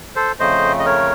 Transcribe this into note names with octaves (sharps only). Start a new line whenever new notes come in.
A4 C5
F2 C#3 A3 C5 D#5
D#5
A#4 C#5